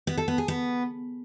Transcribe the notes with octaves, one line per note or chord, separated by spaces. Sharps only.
B3
A4
B3
G#4
B3